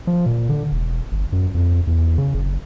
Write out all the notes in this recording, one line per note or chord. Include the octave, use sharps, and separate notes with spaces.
F3
A#2
D3
E1
G1
F#2
F2
E2
C#3
F#1